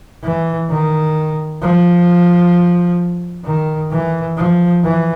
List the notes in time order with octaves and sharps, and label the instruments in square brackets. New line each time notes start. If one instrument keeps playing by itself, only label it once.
[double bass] E3
D#3
F3
D#3
E3
F3
E3